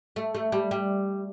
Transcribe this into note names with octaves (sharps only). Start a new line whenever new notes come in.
A3
A3
G3
G3